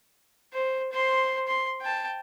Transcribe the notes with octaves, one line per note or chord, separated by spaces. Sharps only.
C5
C5 C6
C6
G5 A5